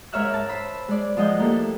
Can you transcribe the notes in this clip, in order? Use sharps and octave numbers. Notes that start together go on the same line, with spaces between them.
G#2 A#4 C#5 E5 F6 F#6
A5 E6
C5 B5 E6
G#3 D5
F3 G#3 D#5 F#5 G6
A3 A#3 E4 G4 A4